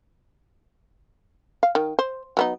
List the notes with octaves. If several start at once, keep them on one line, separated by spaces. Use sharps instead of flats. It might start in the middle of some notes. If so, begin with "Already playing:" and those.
F5
D#3
C5
F#3 B3 D#4